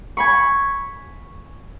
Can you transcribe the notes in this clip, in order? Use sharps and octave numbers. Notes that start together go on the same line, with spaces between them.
G#5 B5 C#6